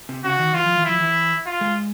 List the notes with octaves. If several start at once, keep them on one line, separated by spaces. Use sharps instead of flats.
C3
C#3 F#4
D#3
E3 F4
F3
E3
F3 E4
E3
F4
G#3